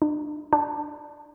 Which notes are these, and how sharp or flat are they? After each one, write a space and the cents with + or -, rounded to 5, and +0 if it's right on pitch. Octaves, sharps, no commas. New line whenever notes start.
D4 +40
D4 +5